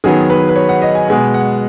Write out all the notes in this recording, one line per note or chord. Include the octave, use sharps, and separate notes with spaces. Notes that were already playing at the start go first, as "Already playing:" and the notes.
D#3 F#3 B3 G#4
B4
B4
C#5
F#5
D#5
G#5
B2 G#3 B3 G#5
F#5